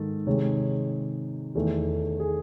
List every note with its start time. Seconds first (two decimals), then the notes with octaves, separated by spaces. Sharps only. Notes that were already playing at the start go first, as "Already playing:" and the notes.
Already playing: G#2 D#3 A4
0.27 C3 D#3 G#3 C#5
1.55 E2 D#3 A3
2.20 G#4